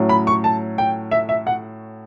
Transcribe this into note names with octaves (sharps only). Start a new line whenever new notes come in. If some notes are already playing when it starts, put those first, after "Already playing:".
Already playing: A2 F#3 C#4
B5
C#6
A5
G5
E5
E5
F#5